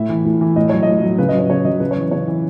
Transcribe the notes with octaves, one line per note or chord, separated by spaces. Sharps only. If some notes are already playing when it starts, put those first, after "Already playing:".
Already playing: A2 E5
E3
A2
E3
A2 D#5
F#3 C#5
A2 D#5
F#3
C#3 B4
F#3 D#5
C#5
C#3 C#5
F#3 D#5
C#3 B4
C#5
E3
C#3 C#5
E3